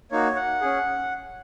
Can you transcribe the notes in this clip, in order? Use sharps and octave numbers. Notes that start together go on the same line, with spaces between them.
A#3 D#4 F#4 C#5
F#5
C#4 G#4